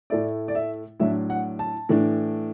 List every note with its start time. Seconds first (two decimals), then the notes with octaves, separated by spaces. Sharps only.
0.10 A2 A3 E4 D5
0.48 D5
0.55 E5
1.00 A2 F#3 D4 E5
1.30 F#5
1.59 A5
1.89 A2 E3 A3 D4